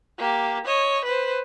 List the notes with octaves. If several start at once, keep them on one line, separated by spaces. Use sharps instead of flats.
A#3 G4
C#5 D#5
B4 C5